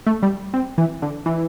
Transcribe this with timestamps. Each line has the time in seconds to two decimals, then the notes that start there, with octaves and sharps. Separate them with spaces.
0.07 A3
0.23 G3
0.54 C4
0.78 E3
1.02 D3
1.26 E3